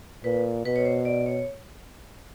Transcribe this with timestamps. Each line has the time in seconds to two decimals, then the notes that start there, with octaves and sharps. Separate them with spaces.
0.24 A#2 B4
0.65 B2 B4
0.76 C#5
0.85 C5
1.05 D5
1.26 C#5